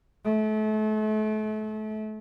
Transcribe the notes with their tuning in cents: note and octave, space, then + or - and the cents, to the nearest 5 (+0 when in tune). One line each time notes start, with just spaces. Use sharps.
A3 -35